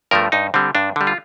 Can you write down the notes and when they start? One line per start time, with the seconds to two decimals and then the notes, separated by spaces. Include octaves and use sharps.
0.11 G2 F3 A3 A#4
0.32 G2 D#4
0.54 D3 G3 C4
0.75 G2 D4
0.96 D3 G3
1.07 F4